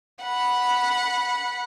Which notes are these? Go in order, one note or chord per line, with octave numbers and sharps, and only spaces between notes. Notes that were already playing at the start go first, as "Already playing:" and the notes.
F#5 B5